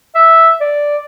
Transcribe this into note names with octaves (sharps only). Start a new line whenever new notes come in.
E5
D5